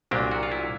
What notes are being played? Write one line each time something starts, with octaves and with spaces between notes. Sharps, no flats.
C2 A#2 F#3 A#3 D4 G4
F#4
F4
E4